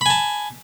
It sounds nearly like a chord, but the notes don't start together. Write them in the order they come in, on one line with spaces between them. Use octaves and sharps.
B5 G#5 A5